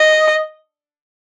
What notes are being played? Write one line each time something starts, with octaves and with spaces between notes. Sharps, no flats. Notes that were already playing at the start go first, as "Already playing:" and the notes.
Already playing: D#5